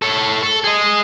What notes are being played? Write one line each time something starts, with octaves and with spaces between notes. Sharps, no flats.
A4 C#5
A4
G#4 D#5